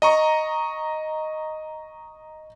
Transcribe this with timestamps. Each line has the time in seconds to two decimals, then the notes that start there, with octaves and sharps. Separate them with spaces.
0.02 D#5 A#5 C#6